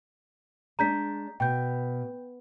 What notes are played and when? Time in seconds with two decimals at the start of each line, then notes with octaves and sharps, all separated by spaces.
0.79 G#3 D4 A#5 G6 B6
1.40 B2 G5 G6